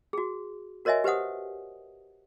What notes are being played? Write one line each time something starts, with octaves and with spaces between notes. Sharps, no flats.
F#4 G#4
F#4 A#4 C#5 D#5 E5 G#5
G4 B4 C5 F#5 D#6